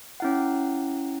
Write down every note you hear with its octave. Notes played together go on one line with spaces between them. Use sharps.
C#4 E4 F#5